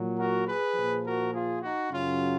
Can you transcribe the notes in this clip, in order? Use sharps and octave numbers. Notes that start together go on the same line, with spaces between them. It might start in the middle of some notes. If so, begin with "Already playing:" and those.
Already playing: A#2 F#3
F#4 A#4
G#4 B4
A#2 F3
F#4 A#4
F4 G#4
D#4 F#4
F#2 C#3 F#3 C#4 F4